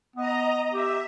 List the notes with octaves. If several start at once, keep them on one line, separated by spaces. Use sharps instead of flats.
B3 D#5 A#5
G4 E5